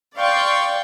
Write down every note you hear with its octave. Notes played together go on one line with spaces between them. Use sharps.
D5 F5 G5 C6 C#6